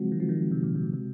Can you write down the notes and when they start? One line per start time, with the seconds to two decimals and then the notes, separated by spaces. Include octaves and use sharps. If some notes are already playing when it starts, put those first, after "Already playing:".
Already playing: C#3 F3 F#3 G#3 C4 F#4
0.12 D#3
0.20 F3
0.29 D#3
0.51 C3
0.63 A#2
0.75 C3
0.93 C3